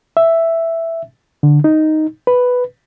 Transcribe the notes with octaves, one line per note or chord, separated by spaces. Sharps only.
E5
D3
D#4
B4